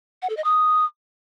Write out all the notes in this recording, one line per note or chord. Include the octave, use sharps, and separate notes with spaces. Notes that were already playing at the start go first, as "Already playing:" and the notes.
F#5
A4
D#5
D#6